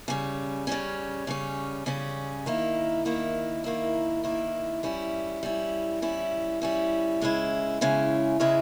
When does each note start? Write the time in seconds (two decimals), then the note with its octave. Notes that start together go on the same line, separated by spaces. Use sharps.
0.08 C#3 G3 C#4
0.67 C#3 G3 C#4
1.27 C#3 G3 C#4
1.86 C#3 G3 C#4
2.46 D#3 A#3 E4
3.05 D#3 A#3 E4
3.64 D#3 A#3 E4
4.24 D#3 A#3 E4
4.83 G3 C#4 E4
5.43 G3 C#4 E4
6.02 G3 C#4 E4
6.62 G3 C#4 E4
7.21 C#3 G#3 C#4 E4
7.81 C#3 G#3 C#4 E4
8.40 C#3 G#3 C#4 E4